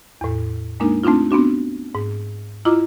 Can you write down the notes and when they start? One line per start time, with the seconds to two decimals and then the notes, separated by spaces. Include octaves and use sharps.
0.21 E2 A2
0.80 G#3 A#3 D4 D#4 A#4
1.04 A3 C4 D4 D#4 F4
1.31 B3 C4 D4 F#4
1.95 G#2
2.65 E4 F4 D#5 A#5 D6